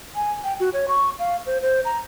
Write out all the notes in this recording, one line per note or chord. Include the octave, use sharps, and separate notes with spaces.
G#5
G5
F#4
C#5
C#6
F5
C5
C5
A#5